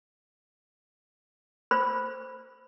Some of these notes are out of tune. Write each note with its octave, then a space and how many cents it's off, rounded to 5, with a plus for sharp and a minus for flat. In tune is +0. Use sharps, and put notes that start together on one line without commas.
C5 +0 B5 +0